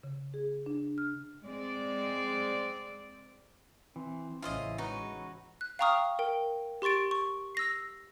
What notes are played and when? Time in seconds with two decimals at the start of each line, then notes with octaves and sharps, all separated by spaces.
0.03 C#3
0.34 G#4
0.66 D4
0.98 F6
1.44 G#3 C4 D5
3.96 E3 C4
4.42 A1 E2 C#3 C#4 E4 F4 C5 D#5
4.78 E3 G#3 D#4 F#4 B4 C#5
5.61 F#6
5.79 F5 G5 A#5 C#6 D#6 F6
6.19 A#4 G5
6.82 G4 C6 C#6 A6 D7
7.11 C#6
7.55 E6 A#6 C7